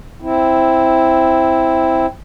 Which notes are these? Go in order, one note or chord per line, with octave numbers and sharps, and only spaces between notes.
C4 E4